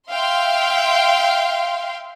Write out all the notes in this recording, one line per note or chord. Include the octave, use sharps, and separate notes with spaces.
E5 F5 G5 C6